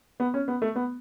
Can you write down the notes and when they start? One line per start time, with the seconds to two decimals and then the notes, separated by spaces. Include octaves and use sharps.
0.20 B3
0.34 C#4
0.48 B3
0.62 A3
0.76 B3